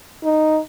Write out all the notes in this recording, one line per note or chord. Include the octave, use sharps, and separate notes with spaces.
D#4